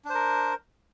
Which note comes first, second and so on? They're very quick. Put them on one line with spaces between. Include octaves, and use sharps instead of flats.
D4 C5 A#4